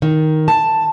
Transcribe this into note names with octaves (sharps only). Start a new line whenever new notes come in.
D#3
A5